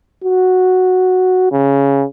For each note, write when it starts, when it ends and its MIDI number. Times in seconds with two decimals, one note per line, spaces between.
0.24 1.48 66
1.52 2.05 49